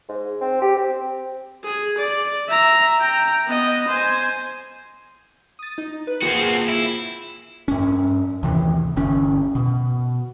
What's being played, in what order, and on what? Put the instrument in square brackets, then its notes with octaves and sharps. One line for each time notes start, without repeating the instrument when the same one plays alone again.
[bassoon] G#2
C4
G4
C4
[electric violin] G#4
D5
E5 A#5
G5 A#5
B3 D#5
C5 G#5
[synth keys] D#6 A6
D#4
B4
[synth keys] A#3 F4 G#4 [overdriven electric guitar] C4 F#4
[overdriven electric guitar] E4
[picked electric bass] G2 C#4
D#2 C3 E3
G1 C#4
B2